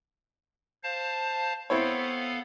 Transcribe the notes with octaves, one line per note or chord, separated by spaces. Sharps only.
C5 F5 A5
B3 C4 E4 A4 C#5 F5